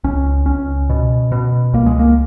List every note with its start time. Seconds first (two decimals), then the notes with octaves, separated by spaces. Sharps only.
0.04 C#2 C#4
0.46 C#2 C#4
0.89 B2
1.32 B2
1.73 C#2 A#3
1.86 G#3
1.99 A#3